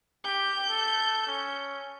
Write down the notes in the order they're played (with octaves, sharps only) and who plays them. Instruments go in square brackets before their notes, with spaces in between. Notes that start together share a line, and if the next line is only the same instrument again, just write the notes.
[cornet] G4 [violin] G6
[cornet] A4
C#4